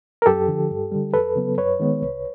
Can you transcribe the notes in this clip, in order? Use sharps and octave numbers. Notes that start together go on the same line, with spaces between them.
A#4
F#2 G4 A4
D3 F3
G2
D3 G3
F2 A4 B4
C#3 F#3 B3
F#2 B4 C#5
D#3 G#3 B3
C2